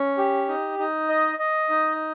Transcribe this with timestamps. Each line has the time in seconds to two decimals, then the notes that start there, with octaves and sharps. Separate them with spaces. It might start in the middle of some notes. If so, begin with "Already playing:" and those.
Already playing: C#4
0.18 G4
0.48 D#4
0.79 D#4
1.09 D#5
1.39 D#5
1.69 D#4